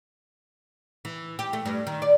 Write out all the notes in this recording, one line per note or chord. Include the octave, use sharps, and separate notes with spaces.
E3
G4
A3
G2
D#3
D5